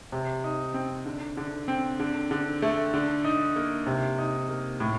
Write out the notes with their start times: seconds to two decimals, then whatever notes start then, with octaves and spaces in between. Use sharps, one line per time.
0.12 C3
0.44 D#4
0.74 C4
1.06 D3
1.37 D3
1.68 C4
2.00 D3
2.31 D3
2.62 A3
2.94 D3
3.24 D#4
3.56 A#3
3.87 C3
4.18 D#4
4.48 A#3
4.80 A2